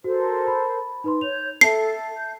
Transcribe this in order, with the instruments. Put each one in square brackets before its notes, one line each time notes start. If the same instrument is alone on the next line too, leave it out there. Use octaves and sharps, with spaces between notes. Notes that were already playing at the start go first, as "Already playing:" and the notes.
[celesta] F#4 [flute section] A4 A#4 C5
[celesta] B5
D#4 B4 C6
[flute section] C#5 G6 [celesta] F7
[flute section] A4 [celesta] E5 A5 [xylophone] C7
[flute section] G6